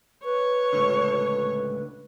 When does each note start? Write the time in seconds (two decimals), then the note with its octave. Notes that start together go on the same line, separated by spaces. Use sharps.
0.24 B4 C#5
0.73 C#2 A2 D3